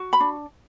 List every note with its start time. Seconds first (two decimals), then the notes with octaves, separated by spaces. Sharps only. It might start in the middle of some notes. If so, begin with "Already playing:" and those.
Already playing: F#4
0.13 B5
0.20 D4